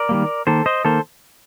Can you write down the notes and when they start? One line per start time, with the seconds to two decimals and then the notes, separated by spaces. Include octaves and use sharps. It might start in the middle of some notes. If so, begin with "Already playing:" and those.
Already playing: A#4 D5
0.09 D#3 G3 A#3
0.47 D#3 A#3 A4 C5
0.66 C5 D#5
0.85 D#3 A#3 A4 C5